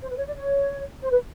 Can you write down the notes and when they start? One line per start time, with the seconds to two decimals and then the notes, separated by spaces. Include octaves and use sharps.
0.02 C5
0.11 B4
0.18 C#5
0.27 D5
0.36 C#5
1.02 C5
1.11 B4